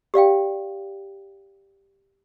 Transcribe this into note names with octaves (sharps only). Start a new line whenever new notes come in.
G4 D5 F5 G5